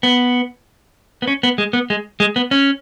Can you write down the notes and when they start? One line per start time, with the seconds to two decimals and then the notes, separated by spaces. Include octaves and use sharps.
0.03 B3
1.22 B3
1.27 C#4
1.43 B3
1.58 G#3
1.73 B3
1.90 G#3
2.20 G#3
2.36 B3
2.51 C#4